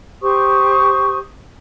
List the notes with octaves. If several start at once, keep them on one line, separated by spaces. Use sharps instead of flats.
G4 C5 C#6 D#6